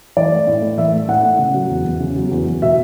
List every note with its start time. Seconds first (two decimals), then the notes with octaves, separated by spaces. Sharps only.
0.17 E3 D5
0.32 A3
0.47 A2
0.63 A2
0.77 E3 E5
0.93 A3
1.08 A2 F#5
1.24 A2
1.39 C#3
1.54 F#3
1.70 E2
1.85 E2
2.00 C#3
2.16 F#3
2.32 E2
2.47 E2
2.62 B2 E5